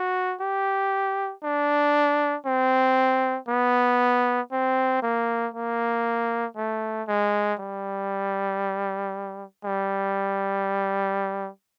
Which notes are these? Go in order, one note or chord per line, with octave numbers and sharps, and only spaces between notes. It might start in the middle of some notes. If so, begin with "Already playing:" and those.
Already playing: F#4
G4
D4
C4
B3
C4
A#3
A#3
A3
G#3
G3
G3